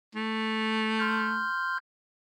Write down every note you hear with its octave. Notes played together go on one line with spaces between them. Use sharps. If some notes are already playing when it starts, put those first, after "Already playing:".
A3
C6 F6 G6